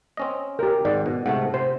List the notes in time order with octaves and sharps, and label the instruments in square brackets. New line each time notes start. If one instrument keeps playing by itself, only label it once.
[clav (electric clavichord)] C4 C#4 D#5
[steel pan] G4 A#4
[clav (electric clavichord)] G#1 G#2 [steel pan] D5
[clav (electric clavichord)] B2
[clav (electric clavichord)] G#2 C3 A3 [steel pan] F#5
[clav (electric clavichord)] C3 [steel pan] C5